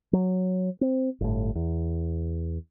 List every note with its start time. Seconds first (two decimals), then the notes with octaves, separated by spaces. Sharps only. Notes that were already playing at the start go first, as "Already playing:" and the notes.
0.13 F#3
0.81 C4
1.21 G1 A2
1.55 E2